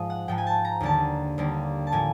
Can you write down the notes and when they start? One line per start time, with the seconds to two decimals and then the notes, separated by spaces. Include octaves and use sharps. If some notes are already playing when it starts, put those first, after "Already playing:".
Already playing: G#2 F3 G#3 D#5
0.10 F#5
0.28 G#2 F3 G#3 G5
0.38 G#5
0.47 A5
0.65 A#5
0.80 D#2 D3 G3 A#3 A5
1.38 D#2 D3 G3 A#3
1.87 A5
1.92 A2 F3 A#3 G#5